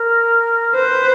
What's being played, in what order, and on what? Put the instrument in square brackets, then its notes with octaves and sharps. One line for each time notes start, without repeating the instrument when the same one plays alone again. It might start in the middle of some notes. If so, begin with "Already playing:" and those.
Already playing: [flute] A#4
[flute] B4 [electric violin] C5